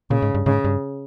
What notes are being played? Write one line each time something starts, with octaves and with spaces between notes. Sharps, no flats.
A#2 C#3
G#2
G2
G#2 C#3
G2